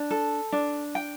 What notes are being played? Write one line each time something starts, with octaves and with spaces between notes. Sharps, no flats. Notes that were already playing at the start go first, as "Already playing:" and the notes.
Already playing: D4
A4
D4
G5